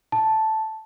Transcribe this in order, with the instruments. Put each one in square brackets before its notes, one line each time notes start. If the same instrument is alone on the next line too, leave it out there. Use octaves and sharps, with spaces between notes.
[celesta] A5